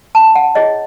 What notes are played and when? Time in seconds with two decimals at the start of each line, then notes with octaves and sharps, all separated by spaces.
0.15 C#4 A5
0.35 F#5
0.55 E4 G#4 C#5 D#5